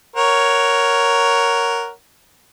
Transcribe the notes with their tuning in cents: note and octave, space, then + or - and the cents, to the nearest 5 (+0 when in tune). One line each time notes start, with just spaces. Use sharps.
A#4 +0 C#5 +5 F#5 +0